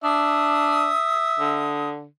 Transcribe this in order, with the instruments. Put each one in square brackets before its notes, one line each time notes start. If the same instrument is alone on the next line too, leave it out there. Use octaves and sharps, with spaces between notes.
[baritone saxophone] D4 [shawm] E5 [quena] D#6
[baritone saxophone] D3